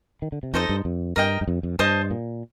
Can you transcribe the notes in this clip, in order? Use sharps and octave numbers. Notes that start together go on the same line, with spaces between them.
D#3
D3
C3
F2 D#4 A4 C5 D#5
G2
F2
G2 A#4 D#5 G5
G2
F2
F2
G2 C5 D#5 A5 D#6
A#2